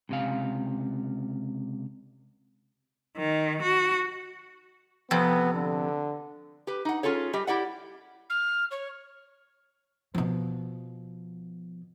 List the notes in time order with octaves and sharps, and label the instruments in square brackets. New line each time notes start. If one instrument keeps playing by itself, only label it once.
[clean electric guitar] C#2 C3 F5
[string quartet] D#3
F#4
[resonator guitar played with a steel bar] F2 C3 [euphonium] B3
[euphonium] D3
[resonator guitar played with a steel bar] G4 B4
D#4 F#5
C#4 F4 G#4 A4 C#5
G3 G4 D#5
E4 G4 D5 F#5
[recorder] F6
C#5
[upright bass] B2 F3